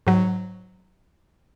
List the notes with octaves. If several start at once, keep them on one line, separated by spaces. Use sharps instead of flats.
G#2 F#3